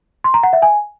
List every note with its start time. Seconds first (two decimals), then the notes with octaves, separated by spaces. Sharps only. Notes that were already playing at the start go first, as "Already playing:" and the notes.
0.24 C6
0.34 A#5
0.43 F#5
0.53 E5
0.62 G#5